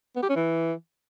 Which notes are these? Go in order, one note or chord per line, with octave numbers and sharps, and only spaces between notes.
B3
G4
C#4
E3